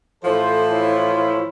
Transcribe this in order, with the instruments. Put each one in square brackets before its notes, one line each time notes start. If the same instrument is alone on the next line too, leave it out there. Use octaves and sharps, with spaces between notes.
[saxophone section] A2 E3 F3 [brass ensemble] A4 C5
[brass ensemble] E4 F4 C#5